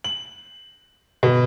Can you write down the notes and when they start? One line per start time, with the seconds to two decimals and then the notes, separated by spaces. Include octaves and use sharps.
0.04 F#7
1.23 B2